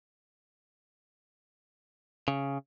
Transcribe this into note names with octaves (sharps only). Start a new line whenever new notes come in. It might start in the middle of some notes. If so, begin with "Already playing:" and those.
C#3